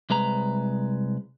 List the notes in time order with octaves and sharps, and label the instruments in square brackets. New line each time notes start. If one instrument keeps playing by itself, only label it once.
[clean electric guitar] C2 G#3 B4 A#5